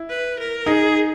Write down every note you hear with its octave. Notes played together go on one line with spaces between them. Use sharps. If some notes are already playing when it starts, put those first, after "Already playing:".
Already playing: E4
B4
A#4
D#4 G#4